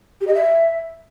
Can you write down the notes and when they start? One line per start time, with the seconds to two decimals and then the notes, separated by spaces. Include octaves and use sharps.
0.20 G4
0.27 D#5
0.34 E5